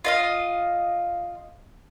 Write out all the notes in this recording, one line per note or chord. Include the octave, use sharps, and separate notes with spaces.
F4 D#5 F5